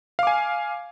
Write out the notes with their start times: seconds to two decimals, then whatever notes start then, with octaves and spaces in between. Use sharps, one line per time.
0.19 F5
0.23 D6
0.27 G#5